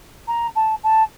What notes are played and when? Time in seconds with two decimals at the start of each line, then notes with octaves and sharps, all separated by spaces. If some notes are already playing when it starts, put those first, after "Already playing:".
0.28 A#5
0.55 A5
0.83 A5